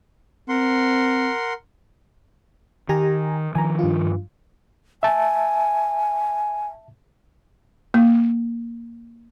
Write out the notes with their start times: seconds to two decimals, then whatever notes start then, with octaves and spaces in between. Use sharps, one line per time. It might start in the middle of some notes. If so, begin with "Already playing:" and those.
0.49 C4 A#4 F#5 C6
2.89 D#3 G4 G#5 A#5
3.55 D#3 F3 G#5 A#5
3.79 G2 F4
5.03 E5 G#5 A5
7.94 A#3